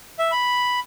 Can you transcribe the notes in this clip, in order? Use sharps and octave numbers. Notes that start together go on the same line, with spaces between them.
E5
B5